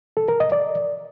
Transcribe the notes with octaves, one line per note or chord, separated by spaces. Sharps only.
A4
A#4
D#5
D5